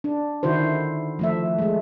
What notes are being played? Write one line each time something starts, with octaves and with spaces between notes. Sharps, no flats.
D4
D3 D#3 E4 F#4 C5
F3 A3 E5
G#3 A3